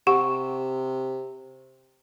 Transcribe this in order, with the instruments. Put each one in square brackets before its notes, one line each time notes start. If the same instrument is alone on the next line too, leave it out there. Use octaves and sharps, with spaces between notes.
[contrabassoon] C3 [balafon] G4 [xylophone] F#5 C#6 D7